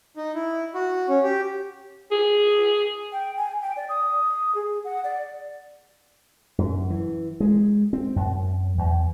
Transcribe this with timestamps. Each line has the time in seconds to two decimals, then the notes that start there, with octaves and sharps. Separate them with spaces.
0.16 D#4
0.35 E4
0.74 F#4
1.08 C#4
1.23 G4
2.11 G#4
3.12 G5
3.37 G#5
3.62 G5
3.76 D5
3.89 D#6
4.55 G#4
4.84 F#5
5.04 D5
6.58 F#2
6.90 E3
7.40 G#3
7.93 C4
8.16 F#2
8.78 E2